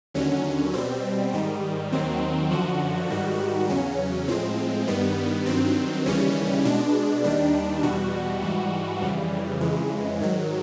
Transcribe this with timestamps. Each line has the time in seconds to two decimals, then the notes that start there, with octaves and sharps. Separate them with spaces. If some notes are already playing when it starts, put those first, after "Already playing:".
0.14 D#2 D3 F#3 C#4
0.73 B2 G3 C4
1.33 G#2 D#3 G3
1.92 D#2 D#3 F#3 C4
2.51 F#2 D3 F3 F#4
3.10 G#2 D#3 G3 F#4
3.70 E2 C#3 F#3 C#4
4.28 A2 F3 G#3 C4
4.87 G2 D#3 G3 B3
5.46 G2 D#3 F#3 C4
6.06 D#2 C#3 E3 G3 C#4
6.65 B2 G#3 D4
7.24 D#2 D#3 G3 D4
7.83 E2 B2 G3 F#4
8.42 G#2 E3 G3
9.01 F2 C#3 E3 G3
9.60 F2 C#3 E3 G#3
10.20 G#2 D#3 F#3